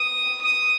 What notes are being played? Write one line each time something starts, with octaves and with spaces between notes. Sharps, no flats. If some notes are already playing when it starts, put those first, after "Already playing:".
Already playing: D#6
D#6